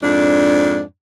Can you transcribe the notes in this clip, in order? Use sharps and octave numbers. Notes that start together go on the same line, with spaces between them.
F2 G#2 D4